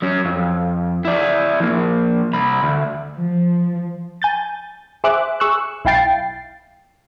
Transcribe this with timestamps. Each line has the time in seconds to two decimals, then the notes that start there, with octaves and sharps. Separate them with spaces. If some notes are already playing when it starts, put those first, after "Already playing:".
0.02 F#3 C#4
0.25 F2
1.05 E4 D5
1.60 F3 A#3
2.33 C2 B5
2.63 D2
3.17 F3
4.22 G#5 G6 A6
5.04 G#4 C5 E5 D6 F#6
5.40 G#4 C#6 E6 F#6
5.85 B1 E4 F5 G5 A6 C7